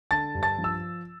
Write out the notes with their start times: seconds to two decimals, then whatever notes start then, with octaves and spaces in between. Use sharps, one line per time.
0.11 D3 A5 A6
0.35 G2
0.43 A5 A6
0.58 F3
0.64 E6